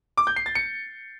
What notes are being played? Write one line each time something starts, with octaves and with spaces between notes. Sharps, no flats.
D6
G6
C7
A6
C#7